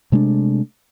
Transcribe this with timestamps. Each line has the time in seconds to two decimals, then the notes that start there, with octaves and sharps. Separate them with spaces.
0.12 C3 G#3 A3 D4